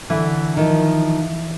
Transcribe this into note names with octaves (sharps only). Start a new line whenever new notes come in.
D3 E3
D#3 F3